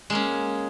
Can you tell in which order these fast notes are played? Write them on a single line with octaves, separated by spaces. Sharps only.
G#3 A#3 C#4